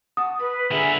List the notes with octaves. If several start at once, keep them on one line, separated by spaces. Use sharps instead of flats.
F#4 A5 D#6
B4 B5
D3 G#4 A#4 B4 E5 G#5